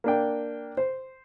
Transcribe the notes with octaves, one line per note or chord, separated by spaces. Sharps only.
A#3 D4 G5
C5